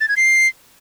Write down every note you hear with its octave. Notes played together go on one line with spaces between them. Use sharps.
A6
G#6
C7